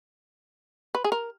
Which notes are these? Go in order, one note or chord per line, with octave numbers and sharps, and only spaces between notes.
B4
G#4
A#4